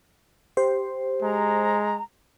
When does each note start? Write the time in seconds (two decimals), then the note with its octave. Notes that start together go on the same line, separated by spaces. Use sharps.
0.57 G4 C5
1.23 G#3 A#5